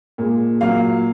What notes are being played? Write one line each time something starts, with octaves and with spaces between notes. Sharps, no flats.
A#2 G#3
A#2 F#3 F5